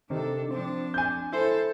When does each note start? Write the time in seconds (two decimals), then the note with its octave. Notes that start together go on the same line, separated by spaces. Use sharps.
0.10 C3 D#3 D4 A4
0.51 F3 C4 D4
0.94 G#5 G6
1.33 E4 A4 C5